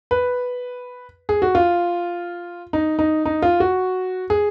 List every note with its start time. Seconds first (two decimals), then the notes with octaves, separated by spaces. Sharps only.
0.11 B4
1.29 G#4
1.42 F#4
1.55 F4
2.73 D#4
2.99 D#4
3.25 D#4
3.42 F4
3.60 F#4
4.30 G#4